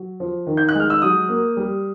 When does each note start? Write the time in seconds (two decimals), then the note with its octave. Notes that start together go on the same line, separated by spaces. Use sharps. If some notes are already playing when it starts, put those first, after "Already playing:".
Already playing: F#3
0.20 F3
0.47 D#3
0.57 G6
0.69 F#6
0.75 G#3 F6
0.90 E6
1.02 F#3 D#6
1.29 A#3
1.57 G3